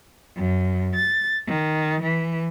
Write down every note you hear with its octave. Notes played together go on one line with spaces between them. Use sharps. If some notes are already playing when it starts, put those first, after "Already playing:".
F#2
A6
D#3
E3